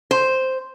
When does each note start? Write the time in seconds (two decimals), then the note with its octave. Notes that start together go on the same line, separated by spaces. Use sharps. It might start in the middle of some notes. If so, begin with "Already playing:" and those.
0.11 C5